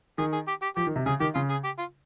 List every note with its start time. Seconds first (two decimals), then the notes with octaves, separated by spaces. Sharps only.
0.18 D#3 G#4
0.33 G#4
0.48 G4
0.62 G4
0.76 F3 G4
0.87 D#3
0.96 C3
1.06 C#3 G#4
1.20 D#3 G4
1.35 C#3 F4
1.50 G#4
1.64 G4
1.79 F4